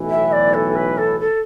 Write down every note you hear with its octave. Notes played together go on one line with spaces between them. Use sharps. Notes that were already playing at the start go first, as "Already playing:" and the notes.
Already playing: B1 A2 E3
E5
D5
A4
B4
A4
A4